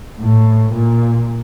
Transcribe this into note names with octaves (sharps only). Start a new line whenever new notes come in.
A2
A#2